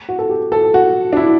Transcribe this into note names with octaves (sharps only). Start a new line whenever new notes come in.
F#4
A4
G4
A4
F#4
D4
E4